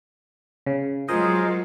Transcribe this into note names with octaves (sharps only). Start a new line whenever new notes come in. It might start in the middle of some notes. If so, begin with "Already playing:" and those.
C#3
F#3 G#3 F4 G#4 A#4 C5 D#5